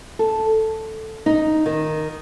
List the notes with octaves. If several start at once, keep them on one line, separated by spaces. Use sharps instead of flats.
A4
D#4
D#3